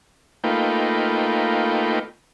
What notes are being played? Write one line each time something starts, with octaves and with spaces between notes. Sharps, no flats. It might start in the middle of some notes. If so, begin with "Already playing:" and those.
A3 A#3 D#4 F4 B4 G5